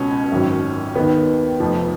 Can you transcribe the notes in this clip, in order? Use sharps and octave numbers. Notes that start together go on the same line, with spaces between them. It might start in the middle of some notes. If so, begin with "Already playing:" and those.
Already playing: C#2 B2 C#4
G#1 F#2 D#3
D#2 D#3 B3
F1 F2 F3